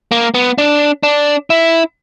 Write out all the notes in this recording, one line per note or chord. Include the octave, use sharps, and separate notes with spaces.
A#3
B3
D4
D4
E4